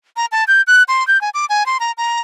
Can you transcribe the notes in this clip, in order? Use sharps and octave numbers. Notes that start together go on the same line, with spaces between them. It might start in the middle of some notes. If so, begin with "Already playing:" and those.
A#5
A5
G6
F#6
C6
G6
G#5
D6
G#5
C6
A#5
A#5